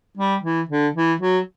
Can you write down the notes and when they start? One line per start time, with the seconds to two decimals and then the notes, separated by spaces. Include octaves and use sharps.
0.17 G3
0.44 E3
0.69 D3
0.95 E3
1.21 F#3